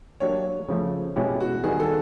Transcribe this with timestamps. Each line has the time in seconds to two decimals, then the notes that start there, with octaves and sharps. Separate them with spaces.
0.20 F#3 A#3 D4 G4 C#5
0.69 C#3 F3 A3
1.16 B2 G#3 C#4 E4 G4
1.40 F#4
1.64 D#3 G3 B3 G#4
1.80 A4